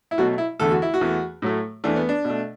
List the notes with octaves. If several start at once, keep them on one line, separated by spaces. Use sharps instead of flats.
E4
B2 F#3 A3 F#4
E4
E2 D3 A3 A4
F#4
E4
F#4
E2 E3 A3
A2 F#3 A3
E2 E3 A3 D4
B3
D4
B2 A3